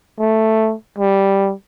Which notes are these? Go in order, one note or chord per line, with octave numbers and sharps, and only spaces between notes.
A3
G3